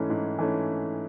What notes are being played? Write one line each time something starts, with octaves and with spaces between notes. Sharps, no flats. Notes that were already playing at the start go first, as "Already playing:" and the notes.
Already playing: G#2 E3 A3 C#4
G#2
E3 A3 C#4